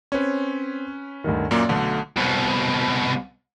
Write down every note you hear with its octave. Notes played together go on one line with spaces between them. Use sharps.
C4 C#4 B4 C#5
D2 G2 D#3
F#2 A#2 A#3 D5
B1 B2 D3 A3
C2 B2